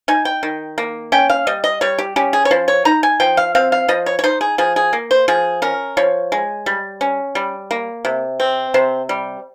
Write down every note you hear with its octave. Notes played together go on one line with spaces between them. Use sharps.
D#4 G#5
G5
D#3
A#3
C#4 G5
F5
G3 D#5
D#5
G3 C#5
G4
C#4 G4
G#4
C#5
F3 C5
C#5
D#4 A#5
G#5
F3 G5
F5
C4 F5
F5
F3 D#5
C#5
C#5
D#4 C5
G#4
F3 G#4
G#4
A#3
C5
F3 G#4
C#4 A#4
F3 C#5
G#3
G3
C#4
G3
A#3
C3
C4
C3 C5
G3